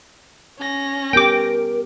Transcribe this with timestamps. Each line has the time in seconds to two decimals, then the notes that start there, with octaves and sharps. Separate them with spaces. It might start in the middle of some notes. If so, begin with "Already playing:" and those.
0.58 C#4 A#6
1.13 B3 G4 A#4 G5 D6